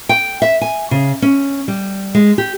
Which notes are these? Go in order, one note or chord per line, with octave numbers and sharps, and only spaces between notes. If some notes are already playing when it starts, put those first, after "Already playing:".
G5
E5
G#5
C#3
C#4
G3
G#3
G4